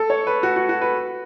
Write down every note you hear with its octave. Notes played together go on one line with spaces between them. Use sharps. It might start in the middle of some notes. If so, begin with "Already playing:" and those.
Already playing: A4
C#5
B4
F#4
F#4
F#4
B4